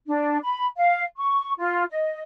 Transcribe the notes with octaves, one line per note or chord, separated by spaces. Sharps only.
D4
B5
F5
C#6
F4
D#5